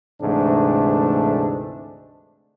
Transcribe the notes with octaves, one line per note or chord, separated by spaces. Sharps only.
D2 G#2 C3 E3 A3 D4